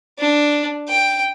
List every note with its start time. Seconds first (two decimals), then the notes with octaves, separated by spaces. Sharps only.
0.19 D4
0.89 G5